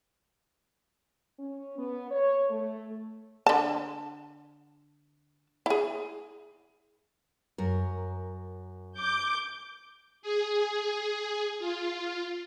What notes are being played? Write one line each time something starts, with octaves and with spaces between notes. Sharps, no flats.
C#4
B3
C#5
A3
D3 A5
E4 G#4
F#2 A#4
D6 G6
G#4
F4